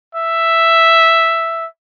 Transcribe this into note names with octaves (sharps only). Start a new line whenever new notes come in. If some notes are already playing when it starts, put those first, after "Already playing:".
E5